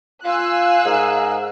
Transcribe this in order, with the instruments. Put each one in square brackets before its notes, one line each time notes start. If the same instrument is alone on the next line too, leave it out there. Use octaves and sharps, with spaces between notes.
[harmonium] F4 [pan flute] F5 [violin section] G#5 E6 F#6
[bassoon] G#2 [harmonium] G#4 A#4